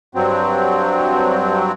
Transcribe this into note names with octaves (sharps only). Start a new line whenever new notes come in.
G2 F#3 C4